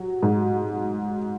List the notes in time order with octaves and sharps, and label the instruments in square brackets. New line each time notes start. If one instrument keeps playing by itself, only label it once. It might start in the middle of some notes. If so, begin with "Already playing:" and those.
Already playing: [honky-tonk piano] F#3
G#2